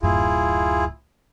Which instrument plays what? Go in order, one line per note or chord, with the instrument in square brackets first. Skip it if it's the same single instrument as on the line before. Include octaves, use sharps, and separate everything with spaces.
[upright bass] D1 F#2 [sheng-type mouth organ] E4 F4 G#4